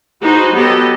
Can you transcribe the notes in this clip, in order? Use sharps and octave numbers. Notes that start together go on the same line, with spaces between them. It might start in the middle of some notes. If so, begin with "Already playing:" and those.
D#4 F#4 G#4 B4 C5
F#3 B3 G4 A4 D#5